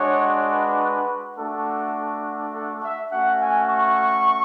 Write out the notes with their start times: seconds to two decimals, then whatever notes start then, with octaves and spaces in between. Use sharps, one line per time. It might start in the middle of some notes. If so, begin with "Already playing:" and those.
Already playing: G#3 D4 F#4 C#5
0.53 B4
1.38 A3 D4 F#4 A4
2.54 A4
2.83 E5
3.12 A3 C#4 F#4 F#5
3.41 G#5
3.71 C#6